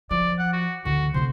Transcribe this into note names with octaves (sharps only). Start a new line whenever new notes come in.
F3 D5
F#5
F#4
D2 D3 F#4
C3 A3 C5